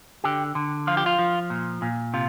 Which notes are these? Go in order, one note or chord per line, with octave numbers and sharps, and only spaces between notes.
D3 G4
D3
F3 F4
G4
F4
F3
A#2
A#2
C3 F4